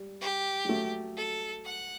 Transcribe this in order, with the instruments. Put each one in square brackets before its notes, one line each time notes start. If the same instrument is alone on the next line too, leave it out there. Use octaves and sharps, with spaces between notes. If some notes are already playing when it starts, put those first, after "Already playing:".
Already playing: [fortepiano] G3
[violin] G4
[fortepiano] G3
F#3 A3
[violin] A4
F#5